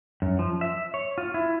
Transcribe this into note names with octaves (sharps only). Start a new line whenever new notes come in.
F#2
F3
E5
C#5
F4
E4